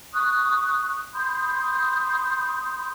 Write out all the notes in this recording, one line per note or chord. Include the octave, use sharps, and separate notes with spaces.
C#6 D#6 F#6
B5 C6 D#6 G6